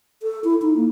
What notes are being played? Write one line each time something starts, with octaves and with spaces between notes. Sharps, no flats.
A4
E4
D#4
A#3